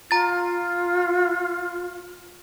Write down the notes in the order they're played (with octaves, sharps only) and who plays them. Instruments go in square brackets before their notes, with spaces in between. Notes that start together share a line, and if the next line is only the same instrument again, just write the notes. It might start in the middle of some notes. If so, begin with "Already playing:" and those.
[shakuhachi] F4 [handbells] A#5 A6